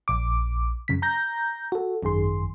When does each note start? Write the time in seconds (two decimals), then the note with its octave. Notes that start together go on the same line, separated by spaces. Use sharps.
0.08 A#1 D6
0.88 F#2 C#3 B6
1.02 A#5 G6 A#6
1.72 F#4 A4
2.03 G#1 F#2 D#3 G#4 C6